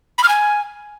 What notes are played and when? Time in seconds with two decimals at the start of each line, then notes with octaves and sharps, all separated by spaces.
0.18 B5
0.23 F6
0.29 G#5